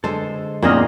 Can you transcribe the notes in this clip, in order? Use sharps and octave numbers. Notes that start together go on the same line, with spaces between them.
D3 G#3 A4 C5
G#1 E2 A#2 A#3 C4 C#4 D#5 F6